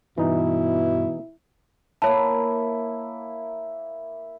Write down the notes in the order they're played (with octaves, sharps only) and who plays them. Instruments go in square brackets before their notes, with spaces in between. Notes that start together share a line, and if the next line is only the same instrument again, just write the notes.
[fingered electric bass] G2 [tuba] B2 [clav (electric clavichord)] E3 D#4 [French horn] E4
[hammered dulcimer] A#3 E4 [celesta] C#5 A5